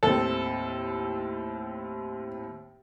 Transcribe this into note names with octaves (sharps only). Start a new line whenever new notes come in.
D#2 A2 C4 A4